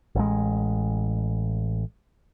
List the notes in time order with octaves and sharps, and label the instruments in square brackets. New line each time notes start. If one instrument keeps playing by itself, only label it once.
[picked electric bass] A1 G#3